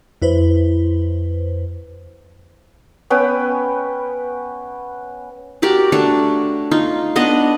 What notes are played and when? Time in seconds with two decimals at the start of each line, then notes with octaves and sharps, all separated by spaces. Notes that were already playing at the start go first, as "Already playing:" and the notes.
0.22 F2 E4 B4 C5
3.10 B3 C#4 B4 G5
5.62 F#4 G4 A#4 D5
5.92 A3 D4 F#4 C#5
6.71 D#4 F4
7.16 B3 D4 D#5 F#5